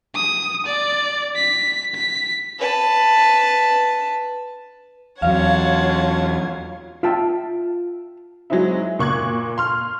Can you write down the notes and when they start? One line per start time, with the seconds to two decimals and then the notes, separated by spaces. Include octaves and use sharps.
0.15 D#6
0.66 D5
1.36 B6
1.95 B6
2.59 B4 A5
5.22 E2 F#3 F4 C#5 F5 F#5 A5 G#6
7.03 F4 E5 G5 A5
8.50 F#3 G#3 C4 D#4 E4
8.99 A#2 C#6 F#6 G#6
9.58 C6 F6